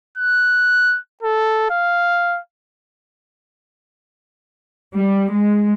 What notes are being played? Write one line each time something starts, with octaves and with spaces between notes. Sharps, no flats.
F#6
A4
F5
G3
G#3